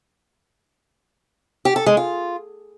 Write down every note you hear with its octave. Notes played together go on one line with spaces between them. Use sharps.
G4
A4
G#3
F4